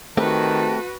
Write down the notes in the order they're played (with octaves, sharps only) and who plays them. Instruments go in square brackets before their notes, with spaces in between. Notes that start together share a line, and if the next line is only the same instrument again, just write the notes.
[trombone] D#3 [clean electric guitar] A3 C4 G4 [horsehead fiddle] F#4 B4 [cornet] A5